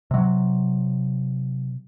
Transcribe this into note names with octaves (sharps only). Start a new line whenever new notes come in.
C3 F#3